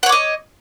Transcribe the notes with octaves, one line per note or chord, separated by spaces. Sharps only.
C#5 D#5 F#5 D6